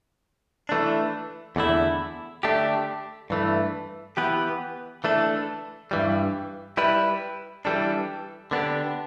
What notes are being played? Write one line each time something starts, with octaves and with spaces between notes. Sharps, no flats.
E3 A3 D4
E2 D3 A3 E4
D3 A3 D4 G4
G2 E3 A3
E3 B3 G4 B4
E3 A3 D4 A4
G2 E3 G3
G3 E4 B4
E3 G3 D4 A4
D3 B3 D4 G4